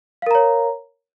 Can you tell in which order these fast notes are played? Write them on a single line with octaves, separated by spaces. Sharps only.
F5 A#4 A#5 C#5